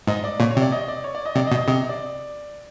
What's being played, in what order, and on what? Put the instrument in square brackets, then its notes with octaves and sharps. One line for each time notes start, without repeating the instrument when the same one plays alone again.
[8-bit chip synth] G#2 [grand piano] D#5
[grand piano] D5
[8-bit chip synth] A#2 [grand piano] C#5
[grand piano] C#5
[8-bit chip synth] C3
[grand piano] D5
D#5
D5
C#5
D5
D#5
[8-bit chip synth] C3 [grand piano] D5
[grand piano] D#5
[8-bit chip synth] B2
[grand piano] D#5
[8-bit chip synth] C3 [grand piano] D#5
[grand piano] D5